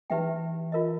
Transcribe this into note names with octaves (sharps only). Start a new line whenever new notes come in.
E3 D#4 G4 B4 E5 G5
F4 A#4 D#5